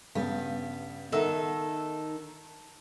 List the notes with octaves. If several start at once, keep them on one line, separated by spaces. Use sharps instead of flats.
G2 C#3 B3
D#3 D#4 A4 E5 F#5 E6